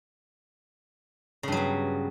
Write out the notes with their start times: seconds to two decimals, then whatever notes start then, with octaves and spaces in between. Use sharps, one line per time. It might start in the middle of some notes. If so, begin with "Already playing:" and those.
1.43 C#3
1.48 G2
1.52 F#3
1.57 B3